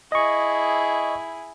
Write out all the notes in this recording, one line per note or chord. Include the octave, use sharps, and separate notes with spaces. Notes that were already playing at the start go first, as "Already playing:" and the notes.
E4 G#4 D#5 C#6